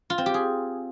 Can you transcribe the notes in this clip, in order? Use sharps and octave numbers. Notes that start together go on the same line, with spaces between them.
F4
C4
G4
G#4